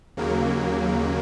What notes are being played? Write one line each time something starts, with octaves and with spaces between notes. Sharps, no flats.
D#2 C#3 F#3 A#3